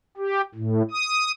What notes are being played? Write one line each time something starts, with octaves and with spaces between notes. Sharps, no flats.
G4
A2
D#6